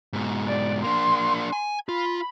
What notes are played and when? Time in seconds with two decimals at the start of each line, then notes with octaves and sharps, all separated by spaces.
0.13 G#2 B2
0.46 D5
0.84 A#3 D4 C6
1.53 G#5
1.89 F4 B5